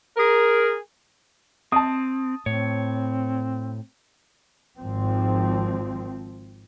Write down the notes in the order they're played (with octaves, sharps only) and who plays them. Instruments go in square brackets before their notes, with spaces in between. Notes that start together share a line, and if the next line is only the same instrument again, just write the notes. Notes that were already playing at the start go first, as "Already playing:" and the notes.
[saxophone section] G#4 A#4
[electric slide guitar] C4 [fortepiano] A5 D#6
[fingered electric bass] A2 [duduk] C4 [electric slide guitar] C#5
[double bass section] G#1 F3 C4